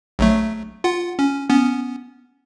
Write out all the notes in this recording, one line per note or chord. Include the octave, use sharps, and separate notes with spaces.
A#1 F#3 A3
F4 F#5
C#4
B3 C#4